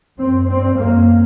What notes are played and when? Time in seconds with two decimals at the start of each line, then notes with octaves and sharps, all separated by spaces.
0.18 F#2 C4
0.48 G2 C4
0.77 F#2 A#3